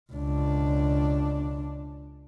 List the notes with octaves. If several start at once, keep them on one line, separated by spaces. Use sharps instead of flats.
C#2 D4